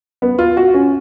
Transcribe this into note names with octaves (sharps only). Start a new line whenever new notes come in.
B3
F4
F#4
C#4